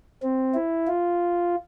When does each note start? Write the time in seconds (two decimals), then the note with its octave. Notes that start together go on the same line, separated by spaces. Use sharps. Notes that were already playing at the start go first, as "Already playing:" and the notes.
0.23 C4
0.54 E4
0.88 F4